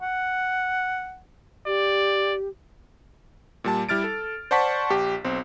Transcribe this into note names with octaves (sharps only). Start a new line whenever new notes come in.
F#5
G4 D5
A#2 G3 A5
G3 E4 F6 A6 D7
A4
C5 D5 F#5 A5 C#6 B6
A#1 G4
B1 C4